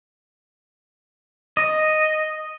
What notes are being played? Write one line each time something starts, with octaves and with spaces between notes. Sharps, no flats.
D#5